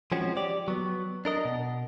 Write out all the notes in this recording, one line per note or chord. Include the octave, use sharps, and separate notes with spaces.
F3 G#3 C4 C#4 F#4
G4 D5
F#3 B3
D4 A#4 D#5
B2